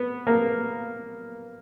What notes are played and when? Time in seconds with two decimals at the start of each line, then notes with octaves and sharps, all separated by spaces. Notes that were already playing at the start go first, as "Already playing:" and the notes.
Already playing: B3
0.27 A#3